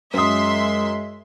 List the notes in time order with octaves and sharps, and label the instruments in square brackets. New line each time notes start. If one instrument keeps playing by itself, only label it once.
[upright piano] F#2 D#6 [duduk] G#3 [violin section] E5 C6